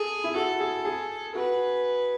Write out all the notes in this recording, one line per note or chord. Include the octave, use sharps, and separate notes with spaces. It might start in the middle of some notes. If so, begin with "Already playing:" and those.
Already playing: G#4 A4
E4
F#4 A4
G#4
G#4
F#4 B4